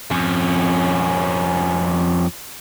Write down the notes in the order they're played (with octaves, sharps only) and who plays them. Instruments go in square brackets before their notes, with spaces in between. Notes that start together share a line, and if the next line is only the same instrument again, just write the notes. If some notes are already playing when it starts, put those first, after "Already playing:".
[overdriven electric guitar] F2 C#4